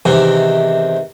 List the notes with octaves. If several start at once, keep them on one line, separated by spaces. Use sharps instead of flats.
E2 C3 D#3